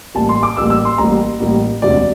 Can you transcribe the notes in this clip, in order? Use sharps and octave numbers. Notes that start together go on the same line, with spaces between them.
A1 A2 G3 A#3 A5
C6
D6
A1 A2 G3 A#3 E6
E6
C6
A1 A2 G3 A#3 A#5
A1 A2 G3 A#3
E1 D2 C3 D5